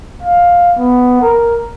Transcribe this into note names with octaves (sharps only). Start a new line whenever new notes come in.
F5
B3
A#4